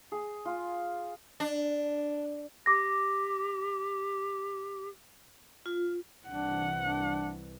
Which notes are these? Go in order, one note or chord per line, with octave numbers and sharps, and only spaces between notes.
G#4
F4
D4
G4 D6 A#6
F4
C2 E3 D4 F#5
D4